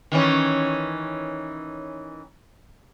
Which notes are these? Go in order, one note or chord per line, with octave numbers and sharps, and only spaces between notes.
D#3 E3 C#4